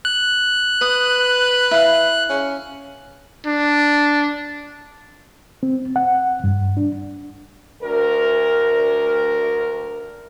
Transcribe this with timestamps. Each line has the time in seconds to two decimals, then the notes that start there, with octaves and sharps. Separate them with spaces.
0.05 F#6
0.81 B4 D#6
1.71 E4 F5
2.29 C#4
3.46 D4
5.63 C4
5.96 F#5
6.44 G2
6.77 D4
7.82 D2 A#4